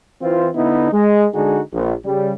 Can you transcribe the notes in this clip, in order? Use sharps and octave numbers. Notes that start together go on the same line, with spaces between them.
E3 C4 F4
D3 B3 D#4 E4
G#3
D3 G#3 D4 D#4 F#4 G#4
A#1
C#3 G3